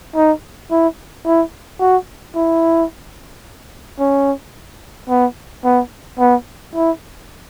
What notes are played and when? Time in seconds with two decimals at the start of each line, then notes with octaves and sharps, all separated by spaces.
0.16 D#4
0.71 E4
1.26 E4
1.80 F#4
2.35 E4
4.00 C#4
5.09 B3
5.64 B3
6.19 B3
6.75 E4